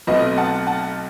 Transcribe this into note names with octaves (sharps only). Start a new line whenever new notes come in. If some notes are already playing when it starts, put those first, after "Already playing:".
B1 B2 A3 C4 B4 D#5
F#5 A5
F#5 A5